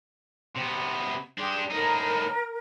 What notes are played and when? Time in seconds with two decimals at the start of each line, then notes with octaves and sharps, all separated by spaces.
0.55 C3 B3
1.38 D4 G4 G#4 C6
1.71 A2 D#4 A#4